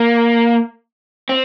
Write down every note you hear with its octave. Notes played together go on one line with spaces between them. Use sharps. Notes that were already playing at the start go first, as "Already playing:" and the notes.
Already playing: A#3
C4